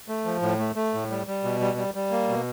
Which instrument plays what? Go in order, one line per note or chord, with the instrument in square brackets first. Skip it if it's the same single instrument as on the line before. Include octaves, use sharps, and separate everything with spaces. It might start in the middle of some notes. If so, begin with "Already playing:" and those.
[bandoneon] A3
F3
A2
A3
A3
A2
G3
G3
B2
G3
G3
G3
A#3
B2